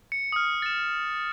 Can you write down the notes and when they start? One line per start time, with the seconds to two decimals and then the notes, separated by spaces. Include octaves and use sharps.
0.12 C#7
0.32 D#6 F6
0.62 A6 E7